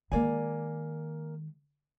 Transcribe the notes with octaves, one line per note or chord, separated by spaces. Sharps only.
D#3 G#3 A#3 D5 G#5